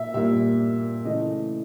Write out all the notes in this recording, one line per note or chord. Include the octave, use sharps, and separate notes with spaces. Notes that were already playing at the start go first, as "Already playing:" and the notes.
Already playing: A#2 A#3 E5
A#2 G3 A#3 E5
C#3 E3 A3 D#5